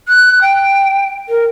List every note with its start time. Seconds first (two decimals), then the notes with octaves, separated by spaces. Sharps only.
0.08 F#6
0.42 G5
1.29 A#4